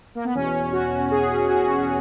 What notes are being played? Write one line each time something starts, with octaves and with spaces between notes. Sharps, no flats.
A#3
B3
E2 B2 C#4
F#4
G#4
F#4